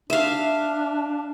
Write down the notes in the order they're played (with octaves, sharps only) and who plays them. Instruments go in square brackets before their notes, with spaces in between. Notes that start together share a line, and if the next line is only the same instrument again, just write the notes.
[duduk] D4 [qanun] E5 F5